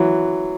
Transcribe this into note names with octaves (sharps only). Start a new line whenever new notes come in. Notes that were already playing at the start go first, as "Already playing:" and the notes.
Already playing: E3 F#3